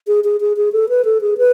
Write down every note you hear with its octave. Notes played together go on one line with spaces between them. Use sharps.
G#4
G#4
G#4
G#4
A4
B4
A4
G#4
B4